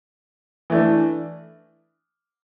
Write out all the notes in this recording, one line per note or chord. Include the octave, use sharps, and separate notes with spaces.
E3 A3 D4